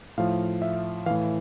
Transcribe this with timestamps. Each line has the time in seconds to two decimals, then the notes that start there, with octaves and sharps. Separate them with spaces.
0.18 A2 F3 F5
0.62 E5
1.06 E3 F5
1.11 A2